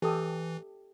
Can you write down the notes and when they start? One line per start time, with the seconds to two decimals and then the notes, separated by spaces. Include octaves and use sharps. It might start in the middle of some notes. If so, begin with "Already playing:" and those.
0.02 E3 G4 A4 D#6